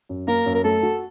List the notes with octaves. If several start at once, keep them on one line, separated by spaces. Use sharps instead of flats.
F#2
A#3 A#4
F#2
A#4
A3 A4
F#4